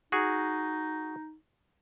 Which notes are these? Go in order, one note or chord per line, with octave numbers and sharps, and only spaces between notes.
D#4 F#4 G#4